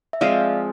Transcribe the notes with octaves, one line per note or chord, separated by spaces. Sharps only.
E5
F3 G#3 C4 F4 D5 F5